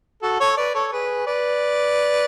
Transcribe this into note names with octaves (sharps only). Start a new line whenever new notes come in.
F#4 A4
A4 C#5
B4 D5
A4 C#5
G#4 B4
B4 D5